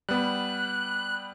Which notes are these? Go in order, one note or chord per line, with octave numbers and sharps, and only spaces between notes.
G3 B3 F#6